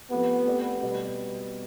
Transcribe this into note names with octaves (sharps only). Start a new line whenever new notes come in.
F3 A3 B3 C4 G4
A3 C4 G4 B4 D5
B2 G3 B3